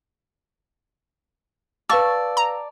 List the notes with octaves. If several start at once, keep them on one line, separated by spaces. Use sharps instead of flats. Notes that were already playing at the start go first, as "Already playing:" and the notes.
B4 D5 F5 A5 C#6 E6
A#5